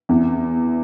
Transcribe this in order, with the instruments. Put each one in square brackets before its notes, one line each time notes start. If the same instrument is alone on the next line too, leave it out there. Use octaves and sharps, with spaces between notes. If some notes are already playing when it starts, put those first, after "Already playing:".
[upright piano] E2